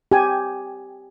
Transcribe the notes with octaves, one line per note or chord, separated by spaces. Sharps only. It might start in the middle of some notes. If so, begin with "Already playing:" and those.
G4 G#5